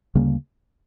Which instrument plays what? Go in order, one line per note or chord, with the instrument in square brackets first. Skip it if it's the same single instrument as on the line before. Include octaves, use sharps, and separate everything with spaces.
[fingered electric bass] D2 C#3 G3 A#3